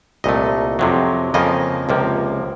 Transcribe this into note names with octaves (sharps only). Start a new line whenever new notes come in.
C2 A#2 A3 D#5
F2 C3 F#3
F2 C#3 F3 A#3 D#5
C#2 C3 F3 A#3